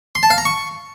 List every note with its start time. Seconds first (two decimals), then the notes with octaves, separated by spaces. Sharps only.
0.15 C6
0.23 A5
0.30 F5
0.38 A#5
0.45 C#6